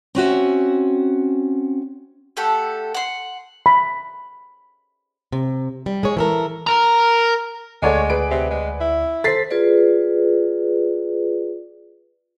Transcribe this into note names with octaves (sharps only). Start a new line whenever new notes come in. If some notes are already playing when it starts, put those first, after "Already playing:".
C4 C#4 F#4 E5
A3 G4 A4 F#5
F#5 C6
B5
C3
G3
G#3 G#4 C#5
E3 A4 A#4
A#4 A#5
D2 G#3 A4 C#5 D5 F#5 G#5
G#4 B4 D7
C3
G#3
E4
A4 C5 A6 B6 C7
F4 G#4 B4 D5